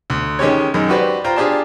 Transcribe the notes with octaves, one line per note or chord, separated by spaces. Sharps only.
D2
D#3 G#3 C#4 G4 C#5
F#2 D#3 G#3
F#4 G4 B4 C5 D5
F4 C5 G5 A#5
D4 F4 G4 G#4 D5 A5